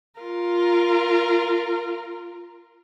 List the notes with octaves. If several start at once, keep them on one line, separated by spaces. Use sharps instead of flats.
F4 A#4